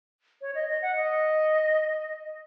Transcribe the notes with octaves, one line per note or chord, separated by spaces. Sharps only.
C#5
D#5
D#5
F#5
D#5